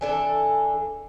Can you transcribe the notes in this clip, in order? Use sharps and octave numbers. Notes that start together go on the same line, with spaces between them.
E3 D4 A4